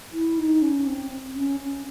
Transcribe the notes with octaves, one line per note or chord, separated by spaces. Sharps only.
E4
D#4
C#4
C4
C#4
C#4